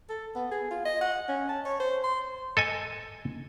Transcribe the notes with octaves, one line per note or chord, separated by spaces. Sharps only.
A4
B3
G#4
F4
D#5
F#5
C#4
A5
C#5
C5
C6
A4 D#5 G#5